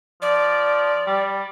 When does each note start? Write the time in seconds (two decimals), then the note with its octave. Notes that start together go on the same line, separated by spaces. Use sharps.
0.22 F3 D5
1.07 G3